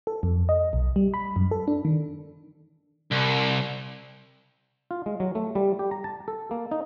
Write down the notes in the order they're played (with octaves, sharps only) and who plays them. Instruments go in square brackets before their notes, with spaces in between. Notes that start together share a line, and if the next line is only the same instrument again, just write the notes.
[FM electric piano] A4
F2
D#5
B1
G3
B5
F#2
A4
D4
D#3
[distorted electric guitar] C2
[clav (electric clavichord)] F4
G#3
F#3
A3
G3
G4
A#5
A5
A4
A#3
D#4